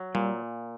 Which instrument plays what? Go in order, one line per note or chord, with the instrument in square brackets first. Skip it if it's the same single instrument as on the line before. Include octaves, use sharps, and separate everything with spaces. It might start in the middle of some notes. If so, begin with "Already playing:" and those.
Already playing: [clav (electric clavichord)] F#3
[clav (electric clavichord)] A#2 [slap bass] G3